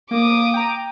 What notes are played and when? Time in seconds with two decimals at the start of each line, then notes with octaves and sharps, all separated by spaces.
0.11 A#3 D6 D#6
0.54 G5 A#5